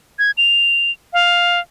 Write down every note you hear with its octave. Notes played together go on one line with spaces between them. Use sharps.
G#6
F7
F5